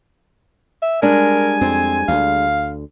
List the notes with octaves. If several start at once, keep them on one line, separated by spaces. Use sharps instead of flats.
E5
G3 G#3 D4 A#4 G#5
F2 C4
D2 F5